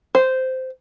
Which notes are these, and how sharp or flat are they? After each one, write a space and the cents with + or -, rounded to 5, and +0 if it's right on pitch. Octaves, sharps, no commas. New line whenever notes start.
C5 -10